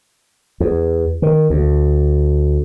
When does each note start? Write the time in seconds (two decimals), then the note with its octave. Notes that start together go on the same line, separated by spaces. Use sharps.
0.60 E2
1.22 D#3
1.50 D2